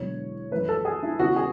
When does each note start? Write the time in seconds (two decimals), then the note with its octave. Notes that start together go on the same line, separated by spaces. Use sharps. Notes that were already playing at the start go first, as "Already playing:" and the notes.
Already playing: E1 E2 D3 F#3 C#5
0.51 F#2 E3 A3 B4
0.69 A4
0.85 G#4
1.03 E4
1.19 E2 C#3 E3 F#4
1.36 G#4